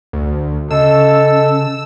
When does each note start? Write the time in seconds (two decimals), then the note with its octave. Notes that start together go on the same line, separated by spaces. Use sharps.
0.13 D2
0.71 C#3 A4 D#5 E6